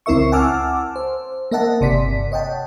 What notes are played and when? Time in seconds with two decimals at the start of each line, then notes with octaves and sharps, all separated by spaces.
0.06 C#2 C4 E4 A#4 E5 C#6
0.32 F#5 G#5 A5 D6 E6 F6
0.96 C5
1.51 A#3 A#4 D#5 E5 F#5 A5
1.81 G1 C3 D5 B6
2.32 C#5 D#5 F#5 G5 A5